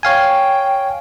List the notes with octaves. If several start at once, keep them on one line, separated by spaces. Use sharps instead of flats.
C#5 F5 G5 G#5